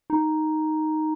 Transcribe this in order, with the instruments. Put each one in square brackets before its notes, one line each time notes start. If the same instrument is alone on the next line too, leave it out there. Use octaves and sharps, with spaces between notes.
[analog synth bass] D#4